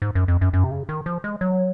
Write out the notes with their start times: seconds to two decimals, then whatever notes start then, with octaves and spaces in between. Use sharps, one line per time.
0.02 G#2
0.15 F#2
0.28 F2
0.41 F#2
0.53 F#2
0.64 C3
0.71 C#3
0.89 D#3
1.06 F3
1.24 G#3
1.41 F#3